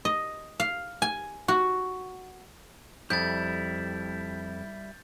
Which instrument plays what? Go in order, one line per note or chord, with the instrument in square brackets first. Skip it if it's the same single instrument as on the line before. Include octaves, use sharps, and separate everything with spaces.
[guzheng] D#5
F5
G#5
F#4
[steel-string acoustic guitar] F2 [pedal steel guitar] G3 E4 [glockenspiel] G6 A6